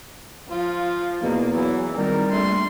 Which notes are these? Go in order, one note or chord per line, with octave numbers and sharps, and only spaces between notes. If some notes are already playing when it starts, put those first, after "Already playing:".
F3 F4
E2 B2 A#3
E3 F#3
G#1 D#3 G3 A#4
A#1 A3 C6